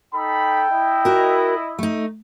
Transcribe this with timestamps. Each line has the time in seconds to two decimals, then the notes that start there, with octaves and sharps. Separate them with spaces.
0.14 D#4 A4 G5 B5
0.71 E4 D#5
1.05 F#4 A#4
1.79 A3 D#4